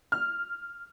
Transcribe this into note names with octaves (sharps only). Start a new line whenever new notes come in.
F6